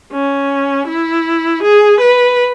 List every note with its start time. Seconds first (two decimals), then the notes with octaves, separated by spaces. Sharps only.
0.13 C#4
0.87 E4
1.63 G#4
2.01 B4